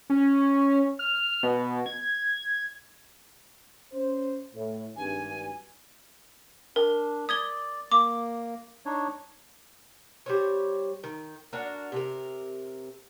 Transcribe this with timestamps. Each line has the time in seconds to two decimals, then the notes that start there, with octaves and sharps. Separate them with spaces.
0.10 C#4
0.99 F6
1.43 B2
1.86 G#6
3.93 C#4 C5
4.55 A2
4.97 G#1 G2 G#5
6.76 D4 A#4
7.29 D5 D#6 G#6 G7
7.92 A#3 D6
8.86 D4 D#4 C#5
10.26 G3 C5 C#5
11.04 D#3
11.53 D4 F#4 A#4
11.92 C3 A#4